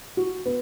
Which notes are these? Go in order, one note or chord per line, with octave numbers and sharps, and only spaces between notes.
F#4
B3